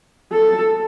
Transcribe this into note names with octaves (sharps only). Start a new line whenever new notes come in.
A4